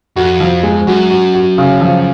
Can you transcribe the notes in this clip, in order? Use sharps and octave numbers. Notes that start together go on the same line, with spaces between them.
F2 F#4
F3
G#3
F#2 F#4
F#4
F#4
C#3
F3